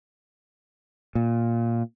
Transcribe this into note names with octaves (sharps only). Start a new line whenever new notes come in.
A#2